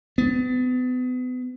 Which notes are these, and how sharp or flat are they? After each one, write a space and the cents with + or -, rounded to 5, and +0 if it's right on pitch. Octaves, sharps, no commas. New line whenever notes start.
B3 +35